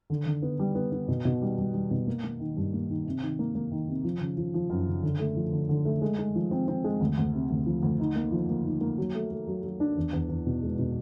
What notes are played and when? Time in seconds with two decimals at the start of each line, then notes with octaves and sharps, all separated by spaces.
0.10 D3
0.26 D3
0.42 B3
0.59 G3
0.75 B3
0.92 B3
1.08 B2
1.25 B2
1.42 G3
1.58 G3
1.74 G3
1.91 B2
2.07 A#3
2.24 A#3
2.40 D#3
2.56 G2
2.73 A#3
2.89 D#3
3.06 C3
3.22 D#3
3.39 A#3
3.55 A#3
3.72 D#3
3.88 C3
4.04 F3
4.21 C#3
4.37 F3
4.54 F3
4.70 F#2
4.87 C#3
5.03 D3
5.20 A3
5.36 F3
5.53 D3
5.69 D3
5.85 A3
6.01 G#3
6.18 G#3
6.35 F3
6.51 C4
6.68 C4
6.84 G#3
7.01 D2
7.17 D2
7.33 C3
7.50 D2
7.66 F3
7.82 D2
8.00 D#4
8.16 A#3
8.32 F3
8.49 A#3
8.65 D#4
8.81 A#3
8.98 F#3
9.15 A3
9.31 A3
9.47 F#3
9.64 F#3
9.80 D4
9.97 E2
10.13 E2
10.29 E2
10.46 B2
10.62 G#3
10.79 B2